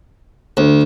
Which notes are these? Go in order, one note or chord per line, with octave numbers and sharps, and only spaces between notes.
D2